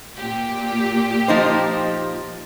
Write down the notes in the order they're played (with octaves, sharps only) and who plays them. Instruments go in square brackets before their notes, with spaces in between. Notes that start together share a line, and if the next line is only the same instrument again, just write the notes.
[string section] A#2 G4
[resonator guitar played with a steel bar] F3 D#4 C5